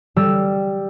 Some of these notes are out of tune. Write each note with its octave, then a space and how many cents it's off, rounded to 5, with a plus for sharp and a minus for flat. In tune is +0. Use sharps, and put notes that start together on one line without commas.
G3 +0 E6 +0